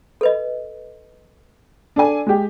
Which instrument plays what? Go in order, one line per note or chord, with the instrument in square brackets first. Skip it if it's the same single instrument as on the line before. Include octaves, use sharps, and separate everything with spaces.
[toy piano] A4 B4 D#5
[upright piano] D4 A4 G#5
G#3 G4